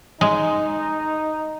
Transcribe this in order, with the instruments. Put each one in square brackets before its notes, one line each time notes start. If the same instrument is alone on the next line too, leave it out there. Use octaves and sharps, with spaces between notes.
[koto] G#3 [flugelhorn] D#4